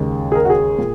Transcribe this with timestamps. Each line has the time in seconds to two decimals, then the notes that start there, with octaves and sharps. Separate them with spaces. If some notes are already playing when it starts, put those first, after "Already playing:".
Already playing: D#2 C#3 G#3
0.32 G#4
0.35 A#4
0.45 F#4
0.50 G#4
0.79 A#2